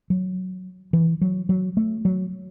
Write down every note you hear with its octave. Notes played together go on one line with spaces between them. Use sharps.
F#3
E3
F#3
F#3
A3
F#3